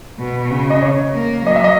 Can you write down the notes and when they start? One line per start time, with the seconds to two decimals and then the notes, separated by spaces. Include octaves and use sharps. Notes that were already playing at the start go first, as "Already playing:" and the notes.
0.19 B2
0.51 C#3
0.70 D#5
0.82 C#5
1.14 A#3
1.46 F#3 D#5
1.56 E5
1.64 D#5